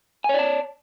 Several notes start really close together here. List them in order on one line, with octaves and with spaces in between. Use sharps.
G#5 C#5 D5 A5